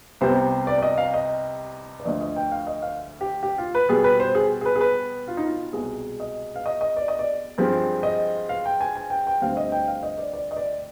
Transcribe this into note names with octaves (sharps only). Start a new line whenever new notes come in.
C2 C3 G3 B3 C5
D5
D5
D#5
F5
D#5
D5
D2 D3 F3 D#5
D#5
G5
F5
D#5
F5
G4
G4
F4
B4
B2 G3 B3 G#4
B4
C5
G#4
G#4
B4
G#4
B4
F4
D#4
F4
C2 B2 G#3 G#4
D#5
F5
D#5
D#5
D5
D#5
D5
G2 F3 G#3 C4
D#5
F5
G5
G#5
G#5
G5
G5
D2 D3 G3 C4 F5
D#5
G5
F5
D#5
D5
D5
D#5
D5